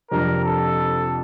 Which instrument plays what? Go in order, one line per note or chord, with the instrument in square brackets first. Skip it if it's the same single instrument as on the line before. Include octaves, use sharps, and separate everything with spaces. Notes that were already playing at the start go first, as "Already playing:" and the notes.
[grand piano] F2 C3 G3 D4 [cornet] A#4
[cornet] A4